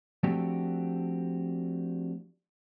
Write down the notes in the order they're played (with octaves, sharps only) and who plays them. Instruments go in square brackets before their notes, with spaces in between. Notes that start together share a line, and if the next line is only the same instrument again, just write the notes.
[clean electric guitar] F3 A3 C4 D4 F#4 G4